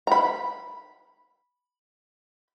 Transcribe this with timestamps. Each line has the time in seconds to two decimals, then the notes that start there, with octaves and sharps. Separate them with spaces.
0.07 A#5 B5